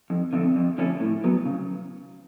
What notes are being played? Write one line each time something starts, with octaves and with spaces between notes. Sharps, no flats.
F2
D3 F3 A3 C4
F2
D3 F3 A3 C#4
A2
F#3 B3
C#3